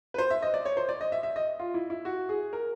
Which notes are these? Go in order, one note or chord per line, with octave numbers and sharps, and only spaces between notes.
B4
C5
E5
D#5
D5
C#5
C5
D5
D#5
E5
E5
D#5
F4
E4
E4
F#4
G#4
A#4